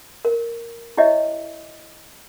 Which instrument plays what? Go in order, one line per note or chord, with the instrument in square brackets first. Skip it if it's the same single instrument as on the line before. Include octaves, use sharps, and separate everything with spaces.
[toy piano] A#4
E4 G4 C#5 D#5 E5